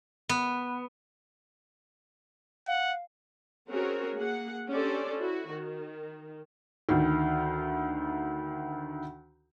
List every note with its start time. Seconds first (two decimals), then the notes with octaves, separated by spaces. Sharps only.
0.29 B3
2.68 F5 F#5
3.69 C4 C#4 F#4 G#4 A#4 C#5
4.18 A#3 G#4 F#5
4.69 C#4 D4 G4 A4 C5 D5
5.16 E4 F#4
5.50 D#3
6.89 D2 D#3